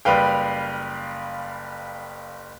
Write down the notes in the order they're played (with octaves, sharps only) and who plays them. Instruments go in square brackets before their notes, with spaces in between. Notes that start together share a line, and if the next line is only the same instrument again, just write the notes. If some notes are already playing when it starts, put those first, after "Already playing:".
[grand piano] F#1 G3 B4 F5 G5